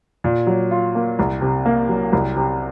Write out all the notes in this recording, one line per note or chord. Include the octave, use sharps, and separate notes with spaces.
A#2
F#3
F4
A#3
C2
C3
A#3
F#3
C2
C3